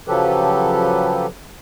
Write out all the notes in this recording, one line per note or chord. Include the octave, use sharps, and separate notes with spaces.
C#3 F3 F#3 G4 A4 B4